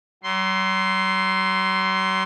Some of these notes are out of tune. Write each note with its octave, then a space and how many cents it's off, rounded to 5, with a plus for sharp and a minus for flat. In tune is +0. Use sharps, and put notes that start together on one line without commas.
F#3 +40 C6 +0